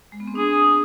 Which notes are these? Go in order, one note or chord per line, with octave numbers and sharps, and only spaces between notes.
G#3
B3
C4
D4 G#4